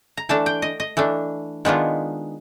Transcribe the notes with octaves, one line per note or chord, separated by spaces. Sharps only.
A#5
E3 A3 D4 A5
G5
D#5
D#5
E3 A3 D4
D#3 G#3 B3 D4 F4